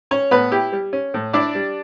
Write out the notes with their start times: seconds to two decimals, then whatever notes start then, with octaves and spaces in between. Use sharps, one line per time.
0.11 C#4 C#5
0.31 A2 B3 B4
0.51 E4 G4
0.72 G3
0.93 C#4
1.14 A2
1.33 D4 E4 D5
1.55 G3